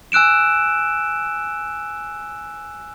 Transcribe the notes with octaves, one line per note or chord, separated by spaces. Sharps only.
G#5 E6 F#6 D7 E7